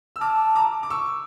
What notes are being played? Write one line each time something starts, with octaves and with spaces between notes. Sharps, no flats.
E6
A5 D6 F6
A#5 D6
D6
C#6 E6